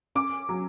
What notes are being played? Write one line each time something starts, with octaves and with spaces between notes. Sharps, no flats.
C#4 D6
F#3